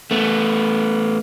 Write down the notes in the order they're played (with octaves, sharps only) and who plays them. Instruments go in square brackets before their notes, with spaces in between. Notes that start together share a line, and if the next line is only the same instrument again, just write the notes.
[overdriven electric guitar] A3 B3